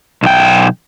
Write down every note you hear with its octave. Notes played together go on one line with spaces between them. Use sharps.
B1 G5